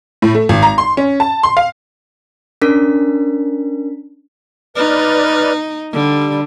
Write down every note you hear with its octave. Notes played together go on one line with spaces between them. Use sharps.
A2
A3
G#1
A#5
C6
C#4
A5
C6
F5
C#4 D4 A#4 B6
D#4 B4 D5 F6
D3 G3